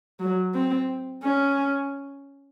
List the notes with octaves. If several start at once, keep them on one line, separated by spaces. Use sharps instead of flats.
F#3
C4
C#4